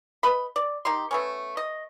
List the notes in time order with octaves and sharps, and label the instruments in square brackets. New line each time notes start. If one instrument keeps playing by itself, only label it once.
[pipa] B4 D#5 B5
D5
D#3 D#4 G4 C6
A3 B3 C#4
D#5